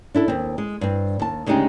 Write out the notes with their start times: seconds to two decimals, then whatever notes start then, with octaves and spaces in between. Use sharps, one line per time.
0.15 D4 E4 A4
0.28 D#2 C4
0.58 G#3
0.81 G2 C4
1.20 D#2 A5
1.46 D2 C#3 G#3 D4 D#4 G4